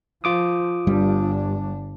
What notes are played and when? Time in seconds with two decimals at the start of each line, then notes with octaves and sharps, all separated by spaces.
0.24 F3 F4 D6 D#6
0.87 G1 G2 G3 D4